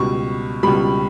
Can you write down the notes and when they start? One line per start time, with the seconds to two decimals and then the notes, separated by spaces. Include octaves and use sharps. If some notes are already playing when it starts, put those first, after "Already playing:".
Already playing: C#2 B2 G3 C#6
0.63 C#2 B2 G3 B5